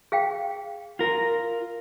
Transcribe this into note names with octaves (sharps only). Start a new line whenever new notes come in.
G#4 F5 G5
F4 A#4